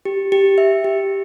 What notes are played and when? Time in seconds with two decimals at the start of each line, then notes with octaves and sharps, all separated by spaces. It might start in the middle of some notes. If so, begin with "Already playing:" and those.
0.05 G4
0.32 G4
0.58 E5
0.84 G4